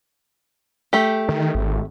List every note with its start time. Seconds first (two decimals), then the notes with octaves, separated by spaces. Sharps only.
0.93 A3 G4
1.29 D#3
1.55 G#1